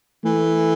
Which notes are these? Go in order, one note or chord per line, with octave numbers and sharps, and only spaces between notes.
E3 A3